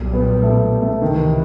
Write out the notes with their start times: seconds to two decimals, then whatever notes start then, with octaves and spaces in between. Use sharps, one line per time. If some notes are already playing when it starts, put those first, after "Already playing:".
Already playing: B1 A#2 G3
0.13 B3
0.43 A3
0.82 A3
1.02 C#2 C3 D#3 E3